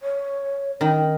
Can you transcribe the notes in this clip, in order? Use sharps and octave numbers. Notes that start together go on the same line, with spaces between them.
C#5
D#3 C#4